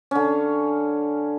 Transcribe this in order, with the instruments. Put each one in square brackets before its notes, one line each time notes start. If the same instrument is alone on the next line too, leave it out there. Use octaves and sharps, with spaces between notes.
[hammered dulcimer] D3 C#4